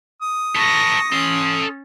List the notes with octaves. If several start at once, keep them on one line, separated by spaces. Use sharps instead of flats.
D#6
A4 B4 C#6 A#6
C#4 A4 C6